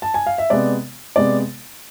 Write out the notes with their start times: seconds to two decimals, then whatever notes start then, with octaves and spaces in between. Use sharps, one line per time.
0.02 A5
0.14 G#5
0.26 F5
0.38 E5
0.50 C3 G#3 B3 D5
1.16 C3 G#3 B3 D5